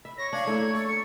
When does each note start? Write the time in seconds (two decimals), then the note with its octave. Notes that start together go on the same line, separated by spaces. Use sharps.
0.05 E5 B5
0.18 C#5 A#6
0.33 D4 F5 G#6
0.47 A3 A#3 E4
0.73 A4
0.89 C#7